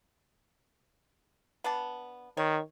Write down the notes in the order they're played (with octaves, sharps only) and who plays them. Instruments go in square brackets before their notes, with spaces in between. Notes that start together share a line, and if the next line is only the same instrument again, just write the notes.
[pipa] B3 D4 A5
[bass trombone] D#3 [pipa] C#5